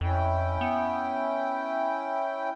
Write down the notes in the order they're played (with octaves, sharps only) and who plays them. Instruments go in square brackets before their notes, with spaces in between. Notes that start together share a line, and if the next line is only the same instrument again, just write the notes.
[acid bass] F2 [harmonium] C#4 E4 G5
[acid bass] B3